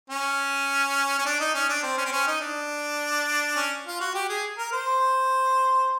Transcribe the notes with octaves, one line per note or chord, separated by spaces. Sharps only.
C#4
C#4
D4
D#4
C#4
D4
C4
C#4
C4
C#4
D#4
D4
C#4
F4
F#4
G4
G#4
A#4
C5